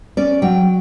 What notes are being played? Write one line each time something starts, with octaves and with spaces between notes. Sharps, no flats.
C#4 D5
F#3 G5